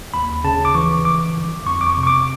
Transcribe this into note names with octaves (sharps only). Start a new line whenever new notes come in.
D#2 B5
C#3 A5
D6
E3 C#6
G1 D6
G1
F2 C#6
D6
C#6
C3
C#6
D6